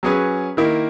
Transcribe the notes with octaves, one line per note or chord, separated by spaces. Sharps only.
F#3 C#4 G#4 B4
D#3 A#3 E4